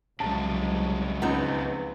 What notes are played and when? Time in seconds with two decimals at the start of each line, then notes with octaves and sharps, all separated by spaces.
0.20 C2 F2 C#3 F#3 G#3 A5
1.22 C#2 B3 C4 D#4